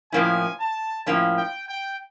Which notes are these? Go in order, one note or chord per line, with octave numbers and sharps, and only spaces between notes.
A2 F3 A#3 C#4 E4 G#5
A5
A2 F3 A#3 C#4 E4
G5
G5